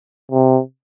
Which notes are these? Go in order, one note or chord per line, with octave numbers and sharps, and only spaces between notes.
C3